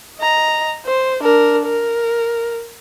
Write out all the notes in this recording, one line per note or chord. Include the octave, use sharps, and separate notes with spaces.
D#5 A#5
C5
D4 A#4
A#4